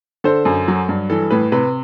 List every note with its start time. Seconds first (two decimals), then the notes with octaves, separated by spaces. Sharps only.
0.24 D3 A4 C5
0.45 F#2
0.68 F#3
0.89 G2
1.10 E3 A4
1.31 A2 B4
1.52 C3 B4